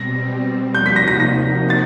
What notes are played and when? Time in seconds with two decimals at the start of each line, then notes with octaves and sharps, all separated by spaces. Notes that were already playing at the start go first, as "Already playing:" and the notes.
Already playing: B2 G3 C4 A#6
0.74 C3 F3 A#3 D#4 F#4 G6
0.86 B6
0.96 A#6
1.08 A#6
1.20 A#6
1.70 A6